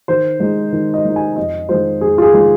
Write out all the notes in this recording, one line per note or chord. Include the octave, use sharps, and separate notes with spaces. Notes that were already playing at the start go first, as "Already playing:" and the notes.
D#3 C5
G#3 D#4
D#3
D#5
G#3 D#4
G#5
F2 D#5
D#3 G#3 F4 C5
F2 G#4
F4
G#4
D#3 G#3 F4